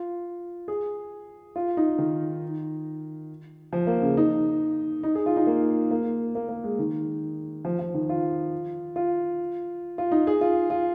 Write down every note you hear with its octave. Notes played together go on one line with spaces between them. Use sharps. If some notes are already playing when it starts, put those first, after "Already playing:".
Already playing: F4
G#4
F4
D#4
D#3
F3
A#3
C#3
D#4
D#4
G#4
F4
D#4
A#3
A#3
A#3
A#3
G#3
D#3
F3
F3
D#3
F4
F4
F4
D#4
G#4
F4
F4